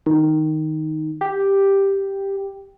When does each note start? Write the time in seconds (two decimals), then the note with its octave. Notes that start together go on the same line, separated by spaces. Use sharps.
0.06 D#3
1.21 G4